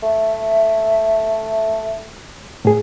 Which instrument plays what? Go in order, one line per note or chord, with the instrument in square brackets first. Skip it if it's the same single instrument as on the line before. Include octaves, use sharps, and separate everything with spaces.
[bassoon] A3 [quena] E5
[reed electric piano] A2 G#4